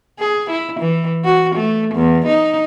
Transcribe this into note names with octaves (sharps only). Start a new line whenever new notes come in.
G#4
E4
E3
F#4
A3
E2
D#4